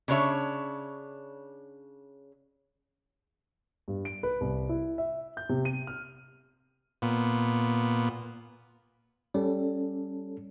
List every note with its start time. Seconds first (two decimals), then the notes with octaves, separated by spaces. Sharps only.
0.08 C#3 D4 C#5 E5
3.88 G2
4.05 D7
4.23 B4
4.41 C2
4.69 E4
4.98 E5
5.37 G6
5.49 C3
5.65 D#7
5.87 F6
7.02 A#2 B3
9.34 G3 C#4 A4